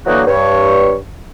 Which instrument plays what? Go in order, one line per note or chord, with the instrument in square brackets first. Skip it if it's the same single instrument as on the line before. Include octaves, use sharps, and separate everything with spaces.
[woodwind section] D3 E3 F#3 A#3 D#4 F#4
G2 C#5